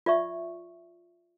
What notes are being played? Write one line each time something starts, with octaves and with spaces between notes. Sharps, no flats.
F4 D5 E5 C#6